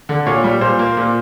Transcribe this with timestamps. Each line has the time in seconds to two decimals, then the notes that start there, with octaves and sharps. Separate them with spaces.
0.09 D3
0.26 A#2 C#5
0.44 G3
0.61 A#2 C5
0.79 A#3
0.97 A#2